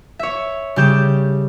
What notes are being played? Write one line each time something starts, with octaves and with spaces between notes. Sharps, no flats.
C#5 E5
C#3 G3 G4 G6 E7